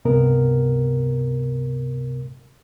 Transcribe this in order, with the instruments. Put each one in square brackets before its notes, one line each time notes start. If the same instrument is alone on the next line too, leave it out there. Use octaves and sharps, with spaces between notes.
[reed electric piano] C#2 G2 C3 B3 A#4